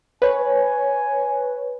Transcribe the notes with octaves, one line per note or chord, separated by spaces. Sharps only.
B4 C#5 G#5